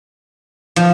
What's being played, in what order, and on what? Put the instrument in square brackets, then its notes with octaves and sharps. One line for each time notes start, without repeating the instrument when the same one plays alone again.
[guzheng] F3